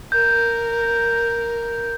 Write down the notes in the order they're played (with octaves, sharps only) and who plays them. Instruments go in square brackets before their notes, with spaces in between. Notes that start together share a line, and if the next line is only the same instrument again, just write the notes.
[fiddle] A#4 [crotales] G6